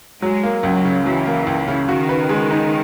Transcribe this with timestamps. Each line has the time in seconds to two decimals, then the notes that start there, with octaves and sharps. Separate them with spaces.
0.22 F#3 G#3
0.43 A#3
0.63 C#2 F#3
0.84 C#3
1.05 E3 F#3
1.26 A#3
1.47 C#2
1.68 C#3
1.88 D#3 F#4
2.09 B4
2.29 G#3
2.51 D#4